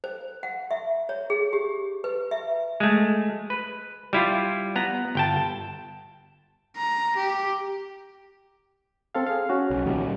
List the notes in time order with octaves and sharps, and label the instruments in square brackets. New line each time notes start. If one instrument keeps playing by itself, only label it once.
[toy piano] C5
F#5
E5
C#5
G#4
G4
B4
E5
[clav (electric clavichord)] G#3 A3
B4
G3 E4 F4
B3 A#5
G1 G5 A5
[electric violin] A#5
G4
[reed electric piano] C4 A4 F5
G#4 F5
C#4 F#4
[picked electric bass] B1
A#2 D#3 G3